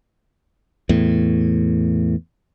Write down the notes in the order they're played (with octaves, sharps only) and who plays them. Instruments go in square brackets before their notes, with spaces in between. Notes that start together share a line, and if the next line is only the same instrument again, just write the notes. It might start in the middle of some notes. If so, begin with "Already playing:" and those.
[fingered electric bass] E2 A2